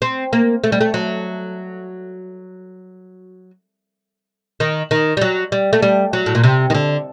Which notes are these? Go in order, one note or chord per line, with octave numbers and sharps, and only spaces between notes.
C4
A#3
A3
G3
A3
F#3
D#3
D#3
G3
F#3
G3
A3
G3
F#3
A2
A#2
C3
D#3
D3